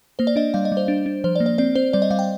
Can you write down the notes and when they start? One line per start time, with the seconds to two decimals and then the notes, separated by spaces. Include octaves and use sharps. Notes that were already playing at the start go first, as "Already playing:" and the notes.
0.19 A#3 C5
0.27 D5
0.36 D4 D#5
0.54 G3 F5
0.65 D#5
0.72 G3
0.77 C5
0.88 D4
1.06 D4
1.24 F3 C5
1.36 D5
1.40 A#3
1.46 D5
1.58 C4 D5
1.75 C4 C5
1.93 G3 D5
2.02 D#5
2.11 G3 F5
2.19 G5